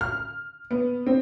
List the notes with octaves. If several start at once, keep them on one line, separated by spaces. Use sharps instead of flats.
F6
B3
C4